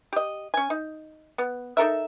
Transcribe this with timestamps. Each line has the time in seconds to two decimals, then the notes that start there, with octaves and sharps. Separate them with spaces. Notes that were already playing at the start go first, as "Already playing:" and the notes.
0.13 G4 D#5
0.54 C#4 G#5
0.70 D#4
1.38 B3
1.77 D#4 A4 A#4 E5